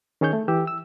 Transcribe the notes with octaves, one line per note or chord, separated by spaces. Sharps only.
D#3 C#4 G#4 C#5 G6
A3
E3 G4 E6
E6